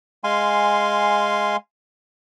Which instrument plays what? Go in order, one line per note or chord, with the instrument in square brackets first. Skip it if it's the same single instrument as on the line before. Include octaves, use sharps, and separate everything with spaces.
[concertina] G#3 F5 G#5 C6